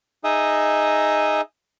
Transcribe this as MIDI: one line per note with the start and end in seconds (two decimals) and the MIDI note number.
0.24 1.41 63
0.24 1.41 68
0.24 1.41 75
0.24 1.41 76